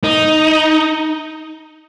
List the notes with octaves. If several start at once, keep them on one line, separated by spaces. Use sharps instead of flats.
D#4